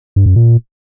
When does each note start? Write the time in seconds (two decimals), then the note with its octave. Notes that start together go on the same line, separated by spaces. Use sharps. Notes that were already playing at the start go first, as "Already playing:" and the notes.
0.16 G2
0.26 F#2
0.36 A#2